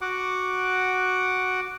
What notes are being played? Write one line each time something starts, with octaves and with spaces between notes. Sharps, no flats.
F#4 F#5 D6